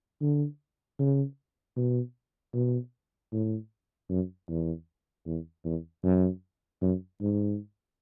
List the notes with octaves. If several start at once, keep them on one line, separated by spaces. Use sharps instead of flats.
D3
C#3
B2
B2
A2
F#2
E2
E2
E2
F#2
F#2
G#2